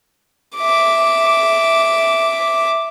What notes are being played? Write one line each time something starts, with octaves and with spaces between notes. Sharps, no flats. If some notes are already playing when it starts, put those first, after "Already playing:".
E5 D6